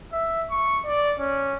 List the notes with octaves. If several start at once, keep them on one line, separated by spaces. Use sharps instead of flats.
E5
C#6
D5
C#4